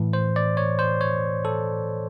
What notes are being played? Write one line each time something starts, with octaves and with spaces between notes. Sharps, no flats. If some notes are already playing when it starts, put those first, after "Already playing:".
Already playing: A2 E3
C5
D5
C#5
C5
C#5
A4